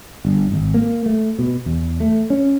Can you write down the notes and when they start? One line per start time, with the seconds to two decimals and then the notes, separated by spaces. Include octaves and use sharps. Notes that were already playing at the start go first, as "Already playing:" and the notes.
0.25 G1
0.52 G#1
0.74 A#3
1.06 A3
1.39 B2
1.66 E2
2.00 A3
2.30 C#4